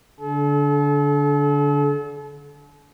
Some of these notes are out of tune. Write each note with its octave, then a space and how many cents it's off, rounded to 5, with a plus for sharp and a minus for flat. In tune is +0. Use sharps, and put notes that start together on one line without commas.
D3 -20 A4 -40